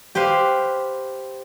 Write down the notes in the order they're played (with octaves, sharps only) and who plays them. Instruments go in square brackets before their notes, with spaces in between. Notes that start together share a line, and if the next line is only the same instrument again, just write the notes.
[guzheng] G4 B4 C5 F5